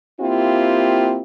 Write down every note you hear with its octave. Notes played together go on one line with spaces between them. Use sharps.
A#3 C4 E4 F4 G4